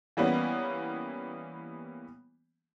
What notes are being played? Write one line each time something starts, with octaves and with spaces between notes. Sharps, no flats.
E3 G3 A#3 B3 C#4